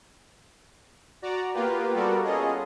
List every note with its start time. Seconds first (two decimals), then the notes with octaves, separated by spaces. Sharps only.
1.22 F#4 D5 A#5
1.54 A#3 B3 F4 G4 B4
1.93 G3 B3 F#4 A4 A#4 D5
2.24 C#4 F4 G#4 A4 D#5